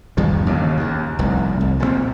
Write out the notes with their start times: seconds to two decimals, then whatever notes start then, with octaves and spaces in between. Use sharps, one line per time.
0.17 E2 G2 D#3 F3
0.46 D#2 C#3
0.77 D#2
1.19 F1 C2
1.61 C2
1.80 A#2 D3 C4